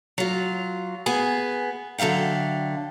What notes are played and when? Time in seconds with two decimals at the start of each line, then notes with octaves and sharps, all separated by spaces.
0.18 F#3 F4
1.06 B3 G#4 G#5
1.98 D3 F#3 E5 F5 G5